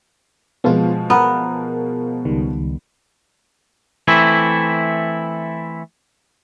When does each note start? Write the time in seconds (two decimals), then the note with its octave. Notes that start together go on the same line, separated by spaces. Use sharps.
0.64 B2 F3 G#3 B3 F4
1.10 B3 A#4
2.25 C#2 D#3 G3
4.08 E3 A3 C4 E4